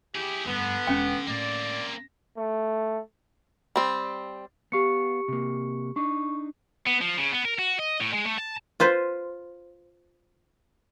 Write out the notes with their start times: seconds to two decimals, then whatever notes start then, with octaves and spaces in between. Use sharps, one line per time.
0.15 E4 G4 G#4
0.45 F1 G2 D3 B3
0.87 E1 E3 C#4 G5
1.27 A2 A#3 C4 D5
2.37 A3
3.76 G3 C4
4.72 B3 G4 F5 C#6 C#7
5.28 C3 A#3
5.96 D4 D#4 C#6
6.87 B3
7.01 F3
7.18 C#3
7.32 B3
7.45 A#4
7.59 F#4
7.79 D#5
8.01 A2
8.14 G#3
8.26 A3
8.38 A5
8.80 F4 B4 C5